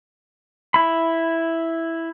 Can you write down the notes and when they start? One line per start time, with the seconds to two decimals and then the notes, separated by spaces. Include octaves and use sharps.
0.74 E4 B5